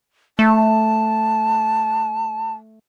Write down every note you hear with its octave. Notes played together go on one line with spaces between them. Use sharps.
A3 A5